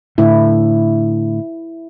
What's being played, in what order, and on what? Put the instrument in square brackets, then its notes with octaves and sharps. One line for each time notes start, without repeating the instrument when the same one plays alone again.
[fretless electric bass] A2 D3 [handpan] E4